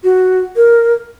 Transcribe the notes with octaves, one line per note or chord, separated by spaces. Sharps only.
F#4
A#4